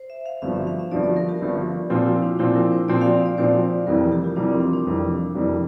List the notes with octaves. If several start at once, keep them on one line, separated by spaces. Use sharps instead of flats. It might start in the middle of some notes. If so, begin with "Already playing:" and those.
Already playing: C5
E5
F5
G1 G2 F3 E5
E5
F5
E5
G1 G2 F3 D5
D5
A#4
G4
G1 G2 F3
A#2 F3 C4 F4
E4
D4
A#2 F3 C4 E4
A#4
C5
A#2 F3 C4 D5
F5
D5
A#2 F3 C4 C5
F1 F2 E3 G3 A#3 A#4
G4
F4
F1 F2 E3 G3 A#3 D4
C4
D4
D4
F1 F2 E3 G3 A#3
F1 F2 E3 G3 A#3